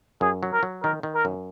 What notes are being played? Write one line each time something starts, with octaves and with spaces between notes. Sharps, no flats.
F#2 G#4
F#3
A#4
F#3
D#3 A#4
D#3
A#4
F#2